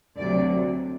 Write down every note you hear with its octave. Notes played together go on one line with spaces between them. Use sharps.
D2 C3 F#3 D5